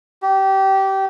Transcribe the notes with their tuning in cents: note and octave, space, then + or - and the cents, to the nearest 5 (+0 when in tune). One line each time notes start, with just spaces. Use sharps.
G4 -20